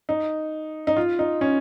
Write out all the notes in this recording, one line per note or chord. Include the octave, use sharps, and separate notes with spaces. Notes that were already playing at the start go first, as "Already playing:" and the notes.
D#4
D#4
F4
D#4
C#4